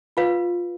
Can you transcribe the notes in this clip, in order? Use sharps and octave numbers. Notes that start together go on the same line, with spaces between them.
F4 B4 F5